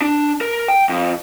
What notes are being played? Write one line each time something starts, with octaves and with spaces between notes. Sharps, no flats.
D4
A#4
G5
F2